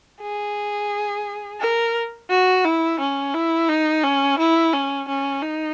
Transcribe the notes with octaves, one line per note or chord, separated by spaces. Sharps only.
G#4
A#4
F#4
E4
C#4
E4
D#4
C#4
E4
C#4
C#4
D#4